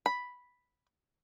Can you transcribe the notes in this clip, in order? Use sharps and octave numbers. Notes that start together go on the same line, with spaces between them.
B5